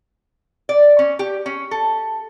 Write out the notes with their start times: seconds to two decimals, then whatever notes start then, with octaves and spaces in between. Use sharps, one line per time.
0.69 D5
0.99 C#4
1.19 G4
1.46 C#4
1.71 A4